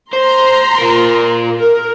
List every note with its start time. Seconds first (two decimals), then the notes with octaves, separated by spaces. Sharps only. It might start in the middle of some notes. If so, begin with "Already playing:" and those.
0.13 C5 A#5 C6
0.78 F4 A#4
1.59 A#4